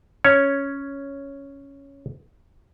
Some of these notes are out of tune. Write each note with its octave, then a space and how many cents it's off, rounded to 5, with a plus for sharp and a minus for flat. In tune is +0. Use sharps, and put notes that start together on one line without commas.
C#4 +0 C#5 +0